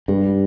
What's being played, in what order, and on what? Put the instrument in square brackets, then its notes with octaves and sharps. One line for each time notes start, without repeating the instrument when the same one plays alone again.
[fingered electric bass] G2 [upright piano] G3